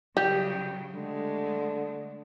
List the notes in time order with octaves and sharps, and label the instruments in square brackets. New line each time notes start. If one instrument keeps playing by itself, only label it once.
[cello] C#3 F#3 [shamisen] G3 [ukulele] G4
[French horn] D3 [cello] G#3 A3